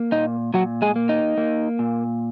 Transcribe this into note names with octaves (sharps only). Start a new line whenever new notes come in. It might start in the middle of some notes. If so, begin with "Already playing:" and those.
Already playing: A#3
A#2 D#4
A#2 F#3 F#4
G#3 G#4
A#3
D#4
A#3
A#2